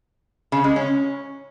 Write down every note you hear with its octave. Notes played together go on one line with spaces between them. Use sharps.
C#3
G#3
C#4